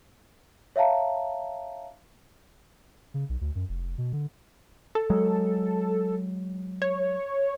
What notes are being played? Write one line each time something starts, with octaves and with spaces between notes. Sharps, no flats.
C#5 E5 F5 A5 A#5
C#3
B1
D2
F#2
F1
B2
D3
A4
F#3 G#3
C#5